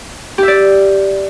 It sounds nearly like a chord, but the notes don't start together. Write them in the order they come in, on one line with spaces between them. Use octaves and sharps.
G4 E5 D5